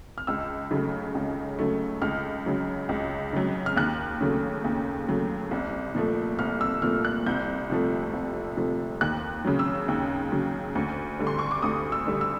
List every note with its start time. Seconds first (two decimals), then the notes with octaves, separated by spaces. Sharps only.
0.18 F6
0.27 C#2 E6
0.71 C#3 F#3 A3
1.15 C#2
1.59 C#3 F#3 A3
2.02 C#2 F6
2.46 C#3 F#3
2.89 C#2
3.33 C#3 F#3
3.66 F6
3.76 D#2 F#6
4.21 C#3 F#3 A3
4.64 D#2
5.08 C#3 F#3 A3
5.51 C2
5.95 A#2 F3 A3
6.39 C2 F6
6.61 E6
6.82 A#2 F3 A3 F6
7.05 F#6
7.26 C2 G6
7.70 C3 F3 A3
8.13 C2
8.57 C3 F3 A3
9.01 D#2 F#6
9.45 C#3 F#3
9.59 E6
9.88 D#2
10.32 C#3 F#3
10.75 D2
11.19 D3 G3
11.27 C6
11.39 C#6
11.51 D6
11.62 D2 D#6
11.92 E6
12.07 D3 G3
12.21 E6